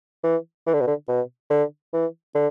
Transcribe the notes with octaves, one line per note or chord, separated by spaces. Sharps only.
E3
E3
D3
B2
D3
B2
D3
E3
D3